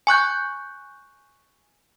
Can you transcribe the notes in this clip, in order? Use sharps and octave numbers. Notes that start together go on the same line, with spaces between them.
G#5 C#6 F#6 G6